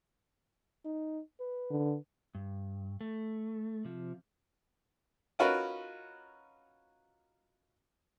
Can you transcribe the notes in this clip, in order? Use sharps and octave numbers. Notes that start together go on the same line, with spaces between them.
D#4
B4
D3
G2
A3
C3 F3
C#4 D#4 F4 F#4 A#4 B4